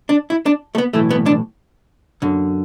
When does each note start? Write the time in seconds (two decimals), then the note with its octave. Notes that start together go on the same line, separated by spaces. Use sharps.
0.09 D4
0.30 E4
0.46 D4
0.75 A3
0.78 B3
0.93 B1 A2 E3 A3
1.11 B3
1.26 D4
2.22 F#2 D3